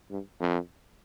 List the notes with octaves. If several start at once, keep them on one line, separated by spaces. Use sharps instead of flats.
G2
F2